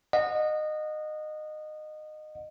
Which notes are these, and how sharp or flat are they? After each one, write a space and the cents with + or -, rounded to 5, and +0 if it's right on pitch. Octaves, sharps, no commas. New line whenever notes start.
D#5 -20 F#5 -30